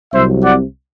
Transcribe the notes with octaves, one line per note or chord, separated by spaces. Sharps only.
C2 C3 F#3 C5 E5
D5 F#5